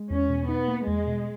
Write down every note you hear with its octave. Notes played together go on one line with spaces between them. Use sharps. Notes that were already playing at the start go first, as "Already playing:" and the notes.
Already playing: G#3
E2 C#4
B2
B3 D#4
A#3
E2 G#3
B2